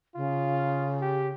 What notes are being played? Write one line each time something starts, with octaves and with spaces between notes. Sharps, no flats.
C#3 F4
G4